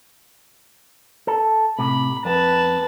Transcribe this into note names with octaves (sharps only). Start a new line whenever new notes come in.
A4
A2 C3 B5
F2 B4 A5